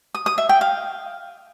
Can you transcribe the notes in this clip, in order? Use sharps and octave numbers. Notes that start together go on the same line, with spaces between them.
D#6
D#6
E5
G5
F5